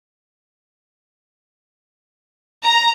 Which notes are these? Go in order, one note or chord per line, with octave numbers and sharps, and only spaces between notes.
A#5